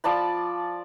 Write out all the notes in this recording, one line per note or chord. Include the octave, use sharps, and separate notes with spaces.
F3 D5 A5 B5